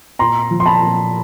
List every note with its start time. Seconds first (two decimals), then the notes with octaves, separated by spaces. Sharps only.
0.19 A#2 A#5 C6
0.51 F3
0.60 C6
0.66 A5 B5
0.82 A#2